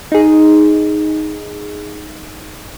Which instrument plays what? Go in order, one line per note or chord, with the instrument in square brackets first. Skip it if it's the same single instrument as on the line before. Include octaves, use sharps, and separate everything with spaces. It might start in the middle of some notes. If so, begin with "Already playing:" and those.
[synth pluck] D#4 G#4